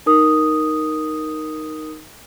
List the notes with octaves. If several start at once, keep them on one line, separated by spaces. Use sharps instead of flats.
D#4 A#4 D#6